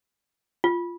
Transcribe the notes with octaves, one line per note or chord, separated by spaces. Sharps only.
F4